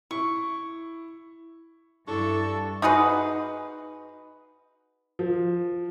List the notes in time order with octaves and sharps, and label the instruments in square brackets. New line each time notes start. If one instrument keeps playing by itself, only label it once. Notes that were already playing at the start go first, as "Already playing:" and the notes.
[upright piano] E4 [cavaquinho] C#6
[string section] G2 [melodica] D4 C#6 [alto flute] E4 [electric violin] A4
[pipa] D#4 F#4 G#4 B4
[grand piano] F3